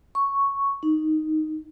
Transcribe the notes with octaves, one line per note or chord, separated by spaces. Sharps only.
C#6
D#4